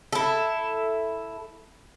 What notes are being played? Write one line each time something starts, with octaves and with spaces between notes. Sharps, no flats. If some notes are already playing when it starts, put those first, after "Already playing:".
E4 A4